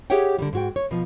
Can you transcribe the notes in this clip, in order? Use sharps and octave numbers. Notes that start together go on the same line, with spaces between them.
G4 G#4 C#5 E5 F#5 G5
D3 F#3 G3
G#2 F#4 G5
C#5
B2 F3